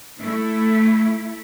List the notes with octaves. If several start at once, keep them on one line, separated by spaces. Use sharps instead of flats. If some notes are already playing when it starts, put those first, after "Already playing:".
A3 E4